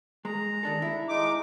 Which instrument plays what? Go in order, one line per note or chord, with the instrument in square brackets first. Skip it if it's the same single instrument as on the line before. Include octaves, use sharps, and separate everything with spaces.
[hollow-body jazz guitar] G#3 [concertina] A#5
[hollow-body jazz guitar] D#3 D4 A4
E4
[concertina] G#3 D#4 [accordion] D6